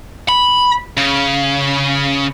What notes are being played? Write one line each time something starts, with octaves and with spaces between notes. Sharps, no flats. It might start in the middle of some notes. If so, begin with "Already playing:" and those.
B5
C#3